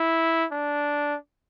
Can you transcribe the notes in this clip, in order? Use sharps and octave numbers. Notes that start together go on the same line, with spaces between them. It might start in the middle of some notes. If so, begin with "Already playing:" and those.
Already playing: E4
D4